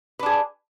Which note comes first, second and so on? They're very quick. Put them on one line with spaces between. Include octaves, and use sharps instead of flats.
B4 D4 G#4